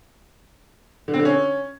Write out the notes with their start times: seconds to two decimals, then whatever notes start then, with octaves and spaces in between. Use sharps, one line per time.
1.08 D3
1.14 C4
1.19 D3
1.25 C#4